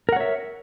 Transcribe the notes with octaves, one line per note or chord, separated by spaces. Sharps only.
A#4 C#5 E5 F#5